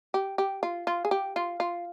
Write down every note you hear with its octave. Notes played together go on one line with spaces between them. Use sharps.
G4
G4
F4
F4
G#4
G4
F4
F4